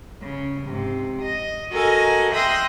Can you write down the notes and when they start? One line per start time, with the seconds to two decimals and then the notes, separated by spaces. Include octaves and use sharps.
0.23 C#3
0.66 G#2 C3
1.24 D#5
1.71 F#4 A4 A#4 D#5 G#5
2.34 E5 G5 C6 D#6 F#6 A#6